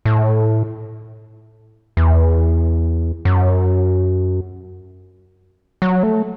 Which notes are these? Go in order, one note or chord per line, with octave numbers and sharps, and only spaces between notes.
A2
E2
F#2
F#3
A3